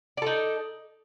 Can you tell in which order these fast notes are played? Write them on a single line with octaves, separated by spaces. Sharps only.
D5 A4 D#4